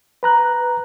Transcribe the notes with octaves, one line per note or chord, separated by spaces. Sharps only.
B4 A#5 F#6